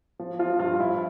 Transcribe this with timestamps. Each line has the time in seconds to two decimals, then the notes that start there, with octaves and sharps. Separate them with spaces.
0.19 F3
0.39 F3 F4
0.59 G2 F4
0.79 F3 E4